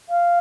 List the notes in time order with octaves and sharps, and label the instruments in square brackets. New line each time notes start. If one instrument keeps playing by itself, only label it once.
[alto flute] F5